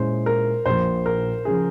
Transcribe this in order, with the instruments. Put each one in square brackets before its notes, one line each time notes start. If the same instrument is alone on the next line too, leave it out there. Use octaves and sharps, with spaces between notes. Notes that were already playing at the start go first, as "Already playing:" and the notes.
Already playing: [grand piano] A#2 G#3 C#4 E4 [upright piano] C5
[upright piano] A#4
[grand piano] A#1 A#2 F3 A#3 [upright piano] C5
[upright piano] A#4
[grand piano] C#3 F3 [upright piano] G#4